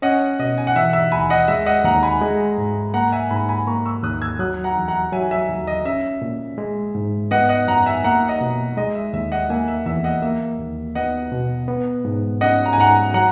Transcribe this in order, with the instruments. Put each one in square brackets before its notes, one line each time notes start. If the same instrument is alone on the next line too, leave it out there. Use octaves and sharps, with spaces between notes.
[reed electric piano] C#4 [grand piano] D#5 F#5
[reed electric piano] B2 [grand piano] D#5
[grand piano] G#5
F#5
[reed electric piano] E3 [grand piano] E5
[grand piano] E5
[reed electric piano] D#2 [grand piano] G#5 B5
[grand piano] D#5 F#5
[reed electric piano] G#3 [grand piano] E5
[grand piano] D#5 F#5
[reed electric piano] D#2 [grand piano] F#5 A#5
[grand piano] G#5 B5
[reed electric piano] G#3
G#2
[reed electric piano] A#3 [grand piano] F#5 A#5
[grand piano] E5 G#5
[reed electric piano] G#2 [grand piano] G#5 B5
[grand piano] G#5 B5
[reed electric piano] A#3 [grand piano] A#5 C#6
[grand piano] C#6 E6
[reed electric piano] D#2 [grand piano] D#6 F#6
[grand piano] E6 G#6
[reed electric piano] F#3 [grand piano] D#6 F#6
[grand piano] F#5 A#5
[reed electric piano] E2
[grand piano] F#5 A#5
[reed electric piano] F#3 [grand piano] E5 G#5
[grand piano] E5 G#5
[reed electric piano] D#2
[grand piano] D#5
[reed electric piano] C#4 [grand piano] E5
[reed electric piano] A#2
G#3
G#2
[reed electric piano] B3 [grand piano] D#5 F#5
[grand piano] D#5 F#5
[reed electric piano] F#2 [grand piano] F#5 A#5
[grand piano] E5 G#5
[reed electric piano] A#3 [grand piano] F#5 A#5
[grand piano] D#5 F#5
[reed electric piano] B2
[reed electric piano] G#3 [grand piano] D#5
[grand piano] E5
[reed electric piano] D#2 [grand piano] E5
[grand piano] D#5 F#5
[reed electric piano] A#3 [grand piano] E5 G#5
[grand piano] E5
[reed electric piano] E2 [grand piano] E5
[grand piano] D#5 F#5
[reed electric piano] A#3 [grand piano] E5
[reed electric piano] D#2
[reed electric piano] B3 [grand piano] D#5 F#5
[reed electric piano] B2
B3
G#2
[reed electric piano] C#4 [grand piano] D#5 F#5
[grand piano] A#5
G#5
[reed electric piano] G#2 [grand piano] F#5 A#5
[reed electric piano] F#3 [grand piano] F#5 A#5